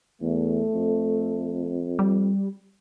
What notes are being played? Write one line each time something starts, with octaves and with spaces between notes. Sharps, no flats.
E2 A3
F2
G3